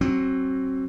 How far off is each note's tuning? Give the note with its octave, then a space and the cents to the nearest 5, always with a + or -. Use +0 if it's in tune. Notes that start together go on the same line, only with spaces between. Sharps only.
F#3 +20 C4 +30